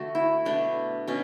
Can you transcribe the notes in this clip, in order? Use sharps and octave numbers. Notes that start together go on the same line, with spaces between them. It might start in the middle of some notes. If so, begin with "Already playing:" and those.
Already playing: D3 A3 D4 F#4
E4
B2 A3 D4
B2 C#4